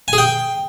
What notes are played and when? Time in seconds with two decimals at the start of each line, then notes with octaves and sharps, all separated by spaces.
0.08 G#5
0.13 G#4
0.18 G5